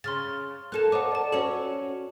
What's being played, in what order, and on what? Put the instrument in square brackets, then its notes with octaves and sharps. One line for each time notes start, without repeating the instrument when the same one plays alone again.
[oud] C#3 [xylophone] C6 F6 A6
[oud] A#3 A4 [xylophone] F#6 E7
[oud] A#4 C#5 D#5 [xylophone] F#5 D6
[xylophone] D5 A5
[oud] C#4 F#4 C#5 [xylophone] A4